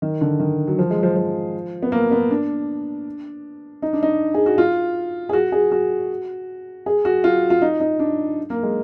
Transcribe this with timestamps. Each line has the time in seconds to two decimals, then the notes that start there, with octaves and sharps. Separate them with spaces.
0.02 D#3
0.21 D3
0.40 D#3
0.67 F#3
0.79 F3
0.90 G#3
1.03 F3
1.16 F3
1.83 B3
1.92 A#3
2.11 B3
2.31 D4
3.82 D#4
3.93 D4
4.03 D#4
4.34 G#4
4.46 F#4
4.58 F4
5.29 G#4
5.33 F#4
5.52 G#4
5.72 F#4
6.86 G#4
7.05 F#4
7.24 F4
7.50 F4
7.62 D#4
7.80 D#4
7.99 D4
8.50 A#3
8.63 G#3